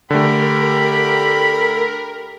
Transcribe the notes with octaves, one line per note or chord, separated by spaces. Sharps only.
D3 A3 G4 A#4 B5